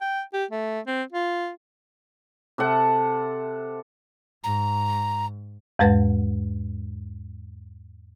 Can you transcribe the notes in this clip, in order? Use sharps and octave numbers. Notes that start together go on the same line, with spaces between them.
G5
G4
A3
C4
F4
C3 A4 F#5 A5
G#2 A#5
E2 G#2 G#3 B4 F#5 A6